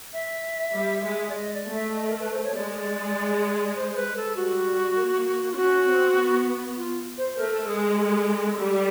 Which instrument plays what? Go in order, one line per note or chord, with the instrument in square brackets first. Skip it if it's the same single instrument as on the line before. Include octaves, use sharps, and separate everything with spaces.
[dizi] E5
[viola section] G3
G#3
[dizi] D5
D#5
D5
[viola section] A3
[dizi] E5
D#5
A#4
B4
C5
C#5
[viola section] G#3 [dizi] D5
[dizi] C5
B4
A4
[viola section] G3 [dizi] F#4
[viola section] A#3
[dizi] F4
[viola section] C#4 [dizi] F#4
[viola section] C4
B3
[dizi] F4
C5
[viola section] A3 [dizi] A#4
[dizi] A4
[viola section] G#3 [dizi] G#4
[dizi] G#4
A4
[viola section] G3